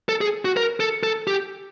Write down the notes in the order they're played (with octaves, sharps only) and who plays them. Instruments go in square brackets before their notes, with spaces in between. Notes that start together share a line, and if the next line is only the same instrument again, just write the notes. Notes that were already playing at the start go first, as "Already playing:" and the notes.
[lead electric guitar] A4
G#4
F#4
A#4
A4
A4
G4